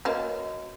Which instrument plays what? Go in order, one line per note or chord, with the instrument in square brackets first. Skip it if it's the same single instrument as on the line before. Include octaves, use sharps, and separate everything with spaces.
[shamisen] A#3 C#4 [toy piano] F#4 B4 D#5